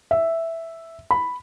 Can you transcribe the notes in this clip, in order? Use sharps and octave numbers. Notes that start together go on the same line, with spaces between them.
E5
B5